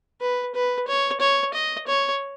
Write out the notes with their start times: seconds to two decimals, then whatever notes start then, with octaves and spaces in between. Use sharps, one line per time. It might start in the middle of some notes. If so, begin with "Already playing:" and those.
0.21 B4
0.55 B4
0.88 C#5
1.20 C#5
1.54 D#5
1.87 C#5